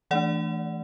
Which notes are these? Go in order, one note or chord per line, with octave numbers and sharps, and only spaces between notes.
E3 A3 D4 D5 F#5